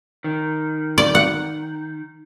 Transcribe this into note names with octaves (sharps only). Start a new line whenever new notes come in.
D#3
D5
F#5